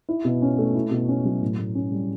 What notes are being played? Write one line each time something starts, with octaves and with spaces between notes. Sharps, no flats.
E4
B2
C#4
A3
E4
B2
C#4
F#3
A2
A2
C#4
G3